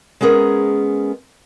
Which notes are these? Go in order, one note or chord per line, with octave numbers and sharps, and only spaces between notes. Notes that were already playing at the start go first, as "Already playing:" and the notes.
G#3 B3 C#4 G#4 A#4